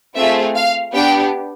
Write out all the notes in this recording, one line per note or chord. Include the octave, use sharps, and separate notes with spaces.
A3 C4 F4 G#4 E5
F5
B3 D4 G4 G5